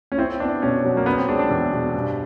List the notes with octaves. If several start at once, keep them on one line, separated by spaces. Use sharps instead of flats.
C#4
C4 E4
B3 D4
B2 C#4
F#3
A#3
B3 C#4
C4
G#3 D4
D4
E2
B2
G2